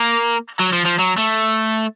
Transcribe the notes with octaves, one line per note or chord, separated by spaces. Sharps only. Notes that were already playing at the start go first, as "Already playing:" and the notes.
Already playing: A#3
F#3
F3
F3
F#3
A3